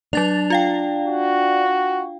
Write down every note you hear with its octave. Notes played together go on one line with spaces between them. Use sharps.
F#3 D4 A6 F7
F4 F5 G5
F#4